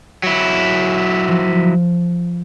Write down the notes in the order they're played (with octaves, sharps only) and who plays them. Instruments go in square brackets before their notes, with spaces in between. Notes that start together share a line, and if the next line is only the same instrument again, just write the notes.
[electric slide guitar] F#3 E4
[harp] F3